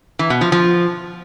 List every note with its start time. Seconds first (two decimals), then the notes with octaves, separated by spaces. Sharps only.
0.19 E3
0.30 B2
0.41 F3
0.52 F3